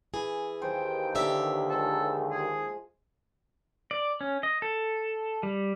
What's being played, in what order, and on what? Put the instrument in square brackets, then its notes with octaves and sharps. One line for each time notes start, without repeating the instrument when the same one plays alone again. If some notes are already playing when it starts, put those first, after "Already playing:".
[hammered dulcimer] E3 [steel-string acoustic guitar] G#4
[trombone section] D#2 [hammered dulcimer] C5 A5 C6 [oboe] G5
[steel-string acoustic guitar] D3 G4 E5 [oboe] E6
[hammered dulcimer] F3 G#3 [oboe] A4
[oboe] G#4
[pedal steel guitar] D5
C#4
D#5
A4
G3